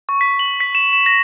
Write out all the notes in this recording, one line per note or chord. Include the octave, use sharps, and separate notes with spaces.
C#6
B6
F#7
B6
E7
E7
A#6